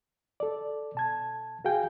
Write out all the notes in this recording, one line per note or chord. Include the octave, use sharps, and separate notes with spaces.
A4 D5
B2 A5 G#6
F#4 G#4 F5 G5 G#5